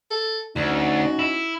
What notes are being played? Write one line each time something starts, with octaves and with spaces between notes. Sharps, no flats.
A4
D2 C#4 D#4 F#4
E4